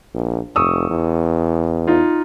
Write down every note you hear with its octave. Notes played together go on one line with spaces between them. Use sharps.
A#1
F1 C#6 D#6 E6
E2
D#4 F4